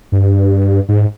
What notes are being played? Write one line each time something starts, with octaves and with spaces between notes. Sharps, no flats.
G2
G#2